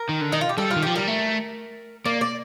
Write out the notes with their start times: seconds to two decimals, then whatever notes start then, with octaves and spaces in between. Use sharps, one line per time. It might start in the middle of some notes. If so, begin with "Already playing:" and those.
Already playing: A#4
0.09 D#3
0.21 D3
0.32 D#3 D#4
0.41 F4
0.49 G4
0.58 G3 A4
0.70 F4
0.76 D#3
0.82 F3 G4
0.96 G3 A#4
1.07 A3
2.05 A#3 D5
2.21 D5